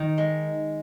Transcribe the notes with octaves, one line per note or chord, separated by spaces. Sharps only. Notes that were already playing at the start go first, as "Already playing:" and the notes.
Already playing: D#3
G#3